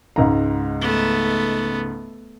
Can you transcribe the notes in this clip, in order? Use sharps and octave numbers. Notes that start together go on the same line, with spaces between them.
C#2 G#2 A#5
A3 B3